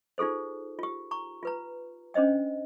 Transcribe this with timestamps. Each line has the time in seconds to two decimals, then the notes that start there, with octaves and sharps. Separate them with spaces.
0.18 D#4 F4 G#4 A4 C5
0.79 F4 G4
1.11 A#5 C#6
1.43 F4 B4 A#5
2.14 C#4 D4 C5 D#5 G5